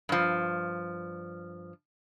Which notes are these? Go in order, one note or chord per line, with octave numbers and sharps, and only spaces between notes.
G2 F3